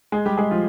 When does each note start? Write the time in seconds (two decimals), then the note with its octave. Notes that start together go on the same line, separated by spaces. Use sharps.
0.12 G#3 G#4
0.26 G3 G4
0.37 G#3 G#4
0.51 F3 F4